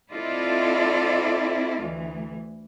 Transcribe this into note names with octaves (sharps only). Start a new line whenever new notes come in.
C4 E4 F4 A4 D5 D#5
D2 E3